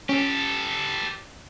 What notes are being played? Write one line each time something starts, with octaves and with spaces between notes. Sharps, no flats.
C#4 G4 A4